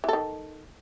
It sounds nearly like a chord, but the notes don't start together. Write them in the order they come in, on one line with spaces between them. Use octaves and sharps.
E3 A4 D#3